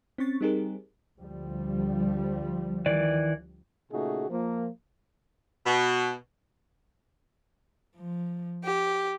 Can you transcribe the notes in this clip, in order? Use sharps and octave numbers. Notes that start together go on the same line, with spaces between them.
C4 C#4 C#6 A6
G3 C4 D#4 G4 G#4 A#4
D2 F3 G3
D#3 E3 D5
A#2 C#3 A3 D#4 F#4 G#4
F3 A#3
B2
F3
G4